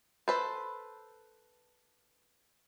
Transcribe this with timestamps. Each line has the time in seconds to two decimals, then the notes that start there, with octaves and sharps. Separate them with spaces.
0.28 A4 B4 C5